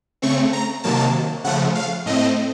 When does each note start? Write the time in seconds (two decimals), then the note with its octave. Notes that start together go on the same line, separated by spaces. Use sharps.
0.22 C#3 A3 C4 C#6
0.53 A#5
0.84 C3 D#3 F#3 A#3 A5
1.44 C#3 F3 A3 F#5
1.75 F5
2.06 A2 A3 C4 D#5